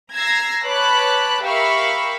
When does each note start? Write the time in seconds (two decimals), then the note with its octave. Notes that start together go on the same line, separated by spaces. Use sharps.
0.13 A#5 E6 G#6 A#6 C7
0.66 B4 C#5 A5 B5 D6 F#6
1.43 G4 A#4 E5 F5 B5 C#6